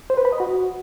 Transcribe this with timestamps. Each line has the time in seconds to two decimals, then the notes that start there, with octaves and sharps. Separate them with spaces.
0.10 C5
0.17 B4
0.25 B5
0.32 D#5
0.40 F#4